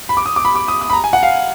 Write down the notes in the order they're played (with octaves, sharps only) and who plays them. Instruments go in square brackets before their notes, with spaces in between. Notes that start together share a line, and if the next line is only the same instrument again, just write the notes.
[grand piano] B5
D6
D#6
D6
B5
D6
D#6
D#6
B5
A#5
G#5
F#5
F5